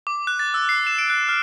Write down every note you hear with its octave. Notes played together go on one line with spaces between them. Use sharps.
D6
F#6
A6
E6
C7
E7
D7
F#6
F6